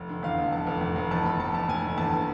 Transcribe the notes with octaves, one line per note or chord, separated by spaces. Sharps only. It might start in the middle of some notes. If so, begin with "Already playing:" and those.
Already playing: F1
D3
E2 F5
F1
F1 A5
F1
E2
F1
E2 A5
F1 B5
F1 A5
F1 A5
F1 G#5
D3
E2 A5